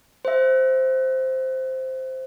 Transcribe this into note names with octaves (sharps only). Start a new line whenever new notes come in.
C5 E5